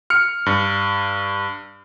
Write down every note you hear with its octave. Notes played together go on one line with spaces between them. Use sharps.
F6 C#7
G2